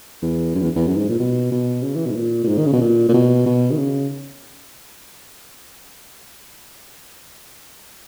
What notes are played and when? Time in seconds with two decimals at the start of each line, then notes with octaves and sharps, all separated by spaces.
0.22 E2
0.55 F#2
0.62 E2
0.76 E2
0.87 F#2
0.97 G#2
1.09 A#2
1.19 B2
1.52 B2
1.83 C#3
1.95 E3
2.06 B2
2.11 G#2
2.16 A#2
2.44 A#2
2.48 G#2
2.59 D#3
2.66 C#3
2.73 B2
2.81 A#2
3.09 A#2
3.14 B2
3.46 B2
3.71 D#3
3.78 C#3